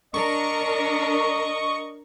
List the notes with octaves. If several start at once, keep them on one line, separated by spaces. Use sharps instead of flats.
D4 A#4 D#5 C#6